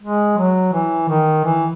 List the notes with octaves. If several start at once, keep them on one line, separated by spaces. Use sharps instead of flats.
G#3
F#3
E3
D#3
E3